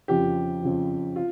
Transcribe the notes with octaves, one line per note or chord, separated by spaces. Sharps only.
F2 C#3 F3 G4
F2 C#3 F3
F4